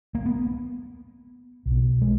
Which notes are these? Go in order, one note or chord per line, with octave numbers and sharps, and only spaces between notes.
A#3
B3
B1 B2
G#3